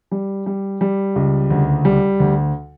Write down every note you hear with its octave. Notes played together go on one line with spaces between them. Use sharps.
G3
G3
G3
C#2
D2
G3
D2